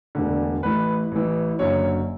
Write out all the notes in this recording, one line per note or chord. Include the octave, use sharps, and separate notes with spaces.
E1 D2 D3
A1 A2 E3 B4
A1 A2 E3
F#1 F#2 D3 C#5